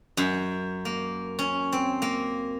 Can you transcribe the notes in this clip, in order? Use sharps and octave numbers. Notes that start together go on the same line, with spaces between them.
F#2
A#3
C#4
C4
A#3